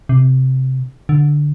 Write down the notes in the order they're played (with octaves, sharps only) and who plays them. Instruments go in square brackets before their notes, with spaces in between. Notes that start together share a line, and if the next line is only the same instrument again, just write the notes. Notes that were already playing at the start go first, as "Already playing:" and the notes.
[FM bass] C3
D3